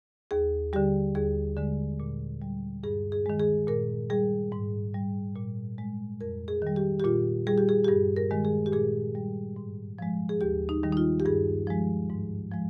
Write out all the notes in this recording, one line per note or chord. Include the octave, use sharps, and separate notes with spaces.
D#2 G#4
D3 G3 G4
D#2 G#4
D3 G#3
A#2
G3
G2 G#4
G#4
D#3 G#3
G#4
A#2 A#4
G3 G#4
G#2
G3
A#2
G#3
F2 A#4
G#4
D#3 G3
G4
G4
A#2 F4
G3 G#4
G4
G#4
G4
G2 G#4
A#4
D#3 G#3
G#4
G4
A#2 G#4
G3
G#2
F3 G#3
G#4
D#2 G4
D#4
D#3 G3
D#4
F4
G4
G2 G#4
F3 G#3
G#2
F3 G#3